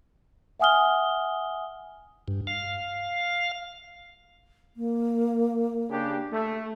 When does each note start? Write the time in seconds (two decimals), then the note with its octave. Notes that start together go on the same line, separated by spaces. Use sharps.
0.60 E5 F#5 G#5 D#6 F6 G7
2.28 G2
2.47 F5
4.76 A#3
5.90 C#3 D4 G4
6.33 A3